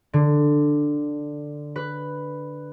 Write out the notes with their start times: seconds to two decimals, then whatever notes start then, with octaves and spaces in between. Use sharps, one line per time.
0.13 D3
1.76 B4